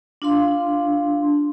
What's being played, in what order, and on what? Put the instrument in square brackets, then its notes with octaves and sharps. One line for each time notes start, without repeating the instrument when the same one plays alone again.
[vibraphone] D4 F4 F5 C6